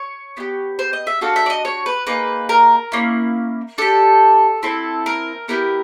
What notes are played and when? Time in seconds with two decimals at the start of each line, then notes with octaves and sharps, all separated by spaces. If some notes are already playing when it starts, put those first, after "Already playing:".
Already playing: C#5
0.37 B3 E4 G4
0.79 C5
0.93 D#5
1.07 E5
1.21 D4 F#4 A4 F5
1.36 E5
1.46 D5
1.50 D#5
1.65 C#5
1.86 B4
2.07 A#3 D#4 G#4 B4
2.49 A#4
2.92 A#3 C#4 E4
3.78 D4 G4 A4
4.63 C4 E4 A4
5.06 A#4
5.48 B3 E4 G4 A#4